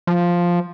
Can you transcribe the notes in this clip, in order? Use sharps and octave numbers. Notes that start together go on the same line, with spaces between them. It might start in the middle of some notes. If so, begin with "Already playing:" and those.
F3